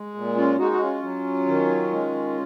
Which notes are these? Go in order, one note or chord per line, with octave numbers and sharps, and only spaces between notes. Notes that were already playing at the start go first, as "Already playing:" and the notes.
Already playing: G#3
A#2
C#4 F4
G#3 D#4 F#4
F#4
C#4 F4
F#3
D#3
G#3